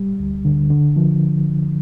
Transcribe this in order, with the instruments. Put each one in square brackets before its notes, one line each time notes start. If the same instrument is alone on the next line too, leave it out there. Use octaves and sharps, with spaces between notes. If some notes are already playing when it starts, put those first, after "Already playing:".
Already playing: [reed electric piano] G3
D2
D3
D3
F3